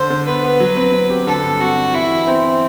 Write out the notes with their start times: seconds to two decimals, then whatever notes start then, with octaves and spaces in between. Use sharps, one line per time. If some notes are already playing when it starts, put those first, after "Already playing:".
Already playing: D3 C5
0.10 D3
0.27 B3 B4
0.44 B3
0.60 F#3
0.77 C4
0.94 C4
1.10 G4
1.27 D3 A4
1.44 G2
1.60 C4 F#4
1.77 C4
1.93 E3 E4
2.10 E3
2.26 B3 C4
2.44 E3